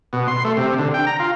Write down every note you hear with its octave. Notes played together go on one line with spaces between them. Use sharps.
B2
C6
A3
C3
D3
G5
A#5
F4